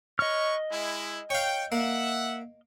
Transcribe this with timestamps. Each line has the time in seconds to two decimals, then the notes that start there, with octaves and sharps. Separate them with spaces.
0.19 B4 C#5 D#5 C#6 F6
0.71 G#3 E4
1.30 C#5 F5 G5
1.72 A#3 E5 F#5